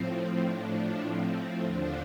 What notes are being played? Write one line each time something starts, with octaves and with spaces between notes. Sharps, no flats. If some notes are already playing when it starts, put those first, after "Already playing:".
Already playing: A2 F3 C4
D4
C4
D#2 D3 F3 D4